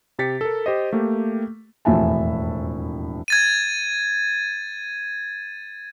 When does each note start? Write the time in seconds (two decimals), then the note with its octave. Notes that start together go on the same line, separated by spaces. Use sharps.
0.19 C3 G4 A6 B6 C#7
0.41 A4 A#4
0.66 G4 C5 D#5
0.93 A3 A#3 G4
1.85 E1 F2 A2 E5 G#5 A5
3.28 G#6 A6 D#7